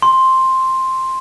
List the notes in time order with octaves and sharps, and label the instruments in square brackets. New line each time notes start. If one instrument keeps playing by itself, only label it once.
[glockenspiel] C6